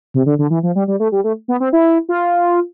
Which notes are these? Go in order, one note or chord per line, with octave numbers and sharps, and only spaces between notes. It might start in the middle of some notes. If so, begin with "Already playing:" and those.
C3
D3
D3
E3
F3
G3
G3
A3
G3
A3
B3
C4
E4
F4